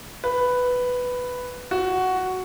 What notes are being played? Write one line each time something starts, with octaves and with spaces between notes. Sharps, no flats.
B4
F#4